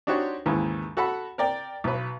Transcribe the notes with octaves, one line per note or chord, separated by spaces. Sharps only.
D4 D#4 F#4 G4 C5 C#5
D#2 G#2 C#3 E3
F#4 A4 F#5 B5
A#4 D5 G5
B1 B4